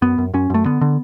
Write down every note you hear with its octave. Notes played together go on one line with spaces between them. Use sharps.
F#2 B3
F#2
F#2 C#4
F#2 A3
D3 B3
D3